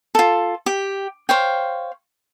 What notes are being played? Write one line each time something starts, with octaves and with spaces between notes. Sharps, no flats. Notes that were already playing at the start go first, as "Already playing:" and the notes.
F4 A4
G4
C5 C#5 F5 G5